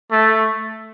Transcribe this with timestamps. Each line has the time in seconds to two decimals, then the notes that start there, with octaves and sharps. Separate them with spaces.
0.11 A3